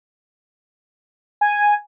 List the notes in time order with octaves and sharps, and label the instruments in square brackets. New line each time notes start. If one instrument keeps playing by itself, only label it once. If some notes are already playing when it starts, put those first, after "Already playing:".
[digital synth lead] G#5